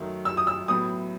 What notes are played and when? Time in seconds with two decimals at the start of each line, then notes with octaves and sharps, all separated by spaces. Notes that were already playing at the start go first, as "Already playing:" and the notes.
Already playing: F#2 D#3 F#3 A3
0.25 E6
0.37 D#6
0.47 E6
0.68 A2 F#3 B3 D#6